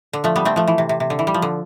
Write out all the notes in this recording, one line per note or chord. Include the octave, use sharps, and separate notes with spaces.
D3
F3 A3
G3 B3
A3 C4
F3 A3
E3
C3
C3
C3
D3
E3
G3
F3
D3